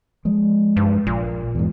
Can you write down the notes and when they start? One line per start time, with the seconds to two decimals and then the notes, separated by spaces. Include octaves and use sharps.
0.25 F3 G#3
0.77 G2
1.07 A#1 A#2
1.55 E2 G#2